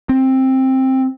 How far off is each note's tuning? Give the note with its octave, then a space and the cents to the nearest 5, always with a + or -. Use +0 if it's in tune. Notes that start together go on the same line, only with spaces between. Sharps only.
C4 +10